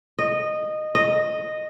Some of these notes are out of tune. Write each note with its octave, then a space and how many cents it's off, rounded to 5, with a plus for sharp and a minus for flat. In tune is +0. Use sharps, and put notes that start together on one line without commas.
D#5 -15
D#5 -10